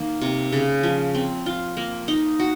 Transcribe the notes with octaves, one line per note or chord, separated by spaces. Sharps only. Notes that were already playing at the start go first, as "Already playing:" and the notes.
Already playing: D#3 A#3
C3
C#3
F3
C4
F4
A#3
D#4
F#4